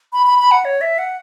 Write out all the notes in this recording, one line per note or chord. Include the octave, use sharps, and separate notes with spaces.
B5
B5
B5
F#5
C#5
E5
F#5